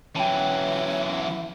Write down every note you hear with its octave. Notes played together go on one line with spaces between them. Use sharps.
E3 F#3 C#4 E5 G5 A5